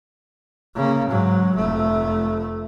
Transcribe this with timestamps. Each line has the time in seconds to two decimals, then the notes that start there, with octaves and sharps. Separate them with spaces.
0.75 C#3 A#3
1.08 G#2 F#3
1.55 F1 A3